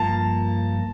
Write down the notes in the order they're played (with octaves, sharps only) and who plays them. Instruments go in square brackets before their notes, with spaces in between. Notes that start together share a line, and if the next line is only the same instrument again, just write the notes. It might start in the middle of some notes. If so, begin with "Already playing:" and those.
Already playing: [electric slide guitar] G2 F3 A#3 [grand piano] A5